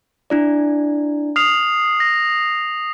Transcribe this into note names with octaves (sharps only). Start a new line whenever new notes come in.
D4 E4 D5
D#6 F6 C7 F7
A#6